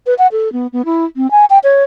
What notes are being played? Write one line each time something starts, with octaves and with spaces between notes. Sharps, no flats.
B4
F#5
A4
B3
B3
E4
C4
G#5
G5
C#5